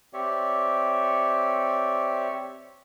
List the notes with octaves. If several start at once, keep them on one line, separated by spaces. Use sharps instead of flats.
C4 G4 C#5 D5 E5